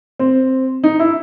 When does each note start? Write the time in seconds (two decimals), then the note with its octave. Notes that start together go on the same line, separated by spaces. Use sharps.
0.19 C4
0.83 D#4
0.99 E4